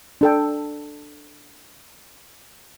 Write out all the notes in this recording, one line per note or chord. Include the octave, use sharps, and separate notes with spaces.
D4 A4 G5